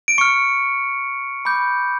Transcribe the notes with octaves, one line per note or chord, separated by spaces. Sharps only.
D7
C#6 F6 C#7
B5 D6 G6